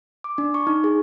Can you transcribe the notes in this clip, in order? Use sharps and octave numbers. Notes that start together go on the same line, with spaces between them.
D6
D4
C#6
D#4
G#4